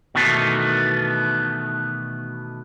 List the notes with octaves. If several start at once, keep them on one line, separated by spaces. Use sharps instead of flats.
B2 D#3 E3 A3 B3